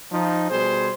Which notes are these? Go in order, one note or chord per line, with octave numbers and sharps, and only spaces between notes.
F3 D#4
B2 G3 G#4 C5